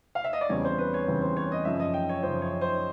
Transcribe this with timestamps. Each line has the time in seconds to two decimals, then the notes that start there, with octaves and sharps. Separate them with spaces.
0.15 F5
0.24 E5
0.33 D#5
0.41 D5
0.49 E2 C#3 E3 G3 C4 C#5
0.65 C5
0.78 B4
0.94 C#5
1.08 E2 C#3 E3 G3 C4
1.22 C5
1.37 C#5
1.52 D#5
1.65 F#2 C#3 F3 E5
1.80 D#5
1.94 G5
2.09 C#5
2.23 F#2 C#3 F3 C5
2.42 C#5
2.61 C5